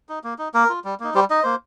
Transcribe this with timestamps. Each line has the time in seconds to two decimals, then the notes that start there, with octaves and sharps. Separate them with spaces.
0.09 D#4
0.24 A#3
0.39 D#4
0.54 A#3 A#4
0.70 F4
0.84 G3
1.00 A#3 D#4
1.14 G3 G4 C5
1.30 D#4 D#5
1.43 A#3 C5